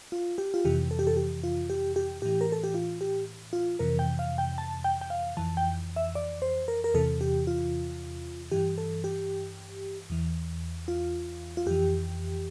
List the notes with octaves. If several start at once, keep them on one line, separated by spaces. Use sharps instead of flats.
F4
G4
F4
F2 C3 E3 G4
A4
G4
A4
G4
F4
G4
G4
A2 E3 G4
A#4
A4
G4
F4
G4
F4
F2 C3 E3 A#4
G5
F5
G5
A5
G5
G5
F5
F2 E3 A5
G5
E5
D5
C5
A#4
A#4
E2 C3 E3 A4
G4
F4
G2 E3 G4
A4
G4
E2 E3
F4
F4
F2 E3 G4